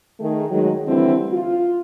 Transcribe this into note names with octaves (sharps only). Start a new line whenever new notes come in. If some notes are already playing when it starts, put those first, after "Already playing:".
D#3 A3 G#4
D#3 F#3 G#3
D3 E3 G3 A3 C4 E4
F4